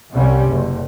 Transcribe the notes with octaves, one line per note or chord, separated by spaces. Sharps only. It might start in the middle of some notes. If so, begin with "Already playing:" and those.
C2 C3 G3 C#4
F#1